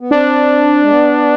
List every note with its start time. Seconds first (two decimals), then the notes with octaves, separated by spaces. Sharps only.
0.01 B3
0.11 C4 D4
0.83 G#3
0.90 B3